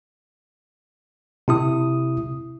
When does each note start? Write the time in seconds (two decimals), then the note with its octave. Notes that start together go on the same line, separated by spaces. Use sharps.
1.48 C3 E4 D#6